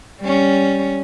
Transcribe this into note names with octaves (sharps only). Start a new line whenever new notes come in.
G3 C#4